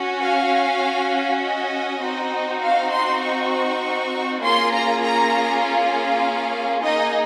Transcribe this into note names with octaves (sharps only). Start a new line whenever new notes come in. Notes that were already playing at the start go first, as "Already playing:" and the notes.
Already playing: C#4 F#4
F5
D#5
C4 D#4 F#4
F5
C6
C#6
A#3 C#4 F4 G#4 C6
A#5
A#5
F5
A#3 D#4 G#4 D#5